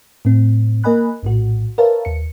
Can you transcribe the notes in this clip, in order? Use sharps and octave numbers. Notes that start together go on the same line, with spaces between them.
A2 C4
A#3 A#4 D#5 G#5 B5 F#6
A#1 A2 F#4
A#4 B4 C#5 E5 F5 A5
D#2 C#7